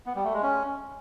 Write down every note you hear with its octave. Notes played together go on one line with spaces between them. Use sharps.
B3
G3
A3
G#3
C#4